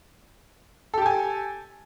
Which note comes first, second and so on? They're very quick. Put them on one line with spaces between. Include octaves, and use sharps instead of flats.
A4 G4 A5 G#5